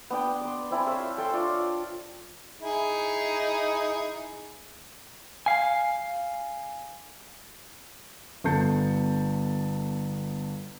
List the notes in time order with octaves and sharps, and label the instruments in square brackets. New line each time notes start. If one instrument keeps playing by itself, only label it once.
[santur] B3 D4 G5
D5 C6
C4 E4 G#5 A5
C5 C#5 E5 F5
A4 G5 A5 C6
D4 F4 C#5 D5
[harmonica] D#4 E4 G#4
[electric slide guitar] F5 G#5
[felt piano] G1 B3 A4 A5 G6 C#7